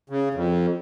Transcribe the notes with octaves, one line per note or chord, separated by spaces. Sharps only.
C#3
F2